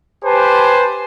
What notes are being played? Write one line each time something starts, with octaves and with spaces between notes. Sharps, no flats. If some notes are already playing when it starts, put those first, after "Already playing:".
G4 B4 C5 G#5 A5